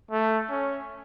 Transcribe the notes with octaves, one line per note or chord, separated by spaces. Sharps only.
A3
C#4